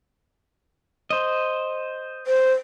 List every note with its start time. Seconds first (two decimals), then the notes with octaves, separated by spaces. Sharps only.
1.10 C5 D#5
2.27 C5